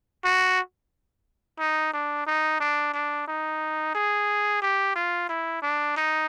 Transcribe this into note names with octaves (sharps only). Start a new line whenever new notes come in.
F#4
D#4
D4
D#4
D4
D4
D#4
G#4
G4
F4
E4
D4
D#4